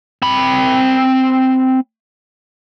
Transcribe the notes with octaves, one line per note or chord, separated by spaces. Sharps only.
C4 B5